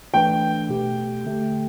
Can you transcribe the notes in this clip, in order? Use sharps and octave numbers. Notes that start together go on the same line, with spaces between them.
E3 A3 D4 B4 G5
B2 A3 G4
D3 A3 G4